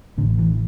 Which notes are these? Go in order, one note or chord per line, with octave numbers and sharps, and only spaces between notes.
A1 A2 D3
E3